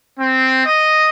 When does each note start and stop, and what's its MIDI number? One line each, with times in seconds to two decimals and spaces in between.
0.17 0.62 60
0.65 1.09 75